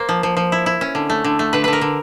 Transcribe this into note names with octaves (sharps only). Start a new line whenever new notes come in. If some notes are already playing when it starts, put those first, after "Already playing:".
Already playing: A#3 C5
F3
F3
F3
E4
E4
C#4
D3
A3
D3
A3
D3 B4
D3 B4
A#4
D3